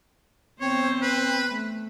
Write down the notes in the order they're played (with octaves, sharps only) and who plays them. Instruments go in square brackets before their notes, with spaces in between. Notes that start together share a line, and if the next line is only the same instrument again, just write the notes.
[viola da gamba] E2 B3 C5 [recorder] C4 [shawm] C#5
[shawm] B4
[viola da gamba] A3